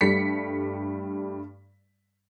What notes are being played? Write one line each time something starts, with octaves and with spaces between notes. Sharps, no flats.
G2 G3 A3 B6 C#7